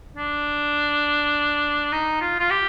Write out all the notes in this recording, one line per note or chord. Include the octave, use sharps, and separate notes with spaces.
D4
D#4
F4
F4
G4